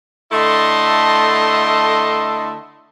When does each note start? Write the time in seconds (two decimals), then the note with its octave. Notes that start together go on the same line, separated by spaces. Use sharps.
0.32 D3 A3 E4 A4 D#5 C6